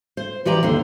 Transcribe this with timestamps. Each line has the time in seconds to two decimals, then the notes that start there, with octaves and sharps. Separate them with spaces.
0.17 C5
0.45 E3 F3 G4 D5 A#5
0.63 D#2 D3 C5